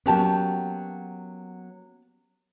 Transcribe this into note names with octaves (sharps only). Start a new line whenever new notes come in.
F#3 A#3 B3 C#4 G4 A5